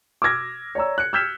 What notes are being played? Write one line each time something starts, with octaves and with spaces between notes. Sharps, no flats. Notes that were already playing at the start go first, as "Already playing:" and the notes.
D6 E6 F6 G#6 A#6
C#5 D5 A#5 E6
F#6 C#7
E6 F6 G6 G#6 B6 E7